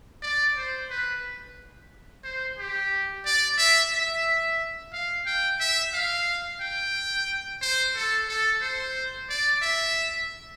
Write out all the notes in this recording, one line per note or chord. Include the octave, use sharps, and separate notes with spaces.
D5
C5
B4
C5
G4
D5
E5
E5
F5
G5
E5
F5
G5
C5
A4
A4
C5
D5
E5